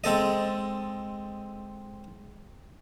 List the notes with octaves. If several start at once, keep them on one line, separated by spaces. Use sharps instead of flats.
G#3 C4 A4 D#5